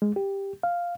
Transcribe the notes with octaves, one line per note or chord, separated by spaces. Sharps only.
G#3
G4
F5